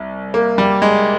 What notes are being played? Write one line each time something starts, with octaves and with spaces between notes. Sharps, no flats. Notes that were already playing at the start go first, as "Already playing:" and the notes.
Already playing: C2
A#3
G3
G#3